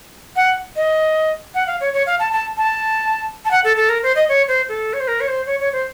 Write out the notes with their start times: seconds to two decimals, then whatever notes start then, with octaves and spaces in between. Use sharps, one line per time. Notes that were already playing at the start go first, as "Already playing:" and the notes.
0.36 F#5
0.76 D#5
1.55 F#5
1.67 F5
1.81 C#5
1.94 C#5
2.06 F5
2.19 A5
2.33 A5
2.57 A5
3.45 A5
3.51 F#5
3.64 A4
3.77 A4
3.89 A#4
4.03 C5
4.16 D#5
4.29 C#5
4.48 C5
4.69 A4
4.93 C#5
5.00 C5
5.08 A#4
5.20 C#5
5.28 C5
5.46 C#5
5.60 C#5
5.73 C5